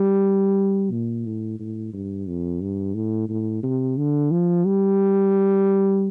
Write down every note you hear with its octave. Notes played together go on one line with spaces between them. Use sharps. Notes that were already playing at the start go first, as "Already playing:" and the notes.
Already playing: G3
A#2
A2
A2
G2
F2
G2
A2
A2
C3
D3
F3
G3